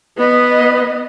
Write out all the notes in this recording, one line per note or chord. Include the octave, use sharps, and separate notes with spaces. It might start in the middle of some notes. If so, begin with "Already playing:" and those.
B3 B4 D#5